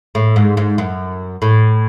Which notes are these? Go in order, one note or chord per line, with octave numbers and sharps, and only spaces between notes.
A2
G#2
G#2
F#2
A2